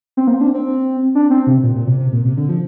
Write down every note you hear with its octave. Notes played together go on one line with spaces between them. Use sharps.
C4
A#3
C4
D4
C4
D4
C4
C3
A#2
A#2
C3
C3
A#2
C3
D3
F3